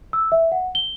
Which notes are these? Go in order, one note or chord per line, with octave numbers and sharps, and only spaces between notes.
E6
E5
F#5
G7